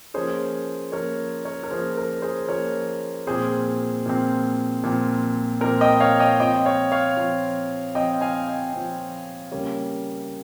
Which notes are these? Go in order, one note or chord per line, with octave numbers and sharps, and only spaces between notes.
F3 A#3 C#4 G#4 C5
F3 A#3 C#4 A#4 C#5
A#4 C#5
A#4
F3 A#3 C#4 G#4 C5
A#4
G#4 C5
F3 A#3 C#4 A#4 C#5
A#2 F3 C4 G#4 C5
A#2 F3 C4
A#2 F3 C4
A#2 F3 C4 A#4
D#5 G5
C#5 F5
D#5 G5
F3 C4 D#5 G5
C#5 F5
C#5 F5
F3 C4
F3 C4 D#5 G5
F5 G#5
D#5 G5
F3 C4
C#3 G3 A#3 C#4